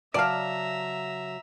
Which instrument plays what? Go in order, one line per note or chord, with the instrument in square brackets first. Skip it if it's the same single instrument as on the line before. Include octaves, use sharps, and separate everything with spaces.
[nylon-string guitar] C#3 F#3 A5 [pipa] D5 F5 [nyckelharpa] E5 A#5